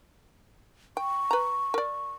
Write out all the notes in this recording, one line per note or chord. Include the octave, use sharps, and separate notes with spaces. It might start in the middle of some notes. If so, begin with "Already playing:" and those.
G5 C#6
B4 A#5
A#4 D5